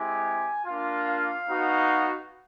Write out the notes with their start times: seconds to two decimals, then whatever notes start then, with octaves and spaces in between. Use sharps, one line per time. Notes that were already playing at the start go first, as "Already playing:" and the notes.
Already playing: G#3 C4 E4 G4 G#5
0.65 A#3 D4 F4
1.06 F5
1.48 B3 D#4 F#4